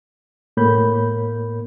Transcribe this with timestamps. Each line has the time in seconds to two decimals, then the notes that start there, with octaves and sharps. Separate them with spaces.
0.57 A2 A#3 A#4 C#5 B5 G6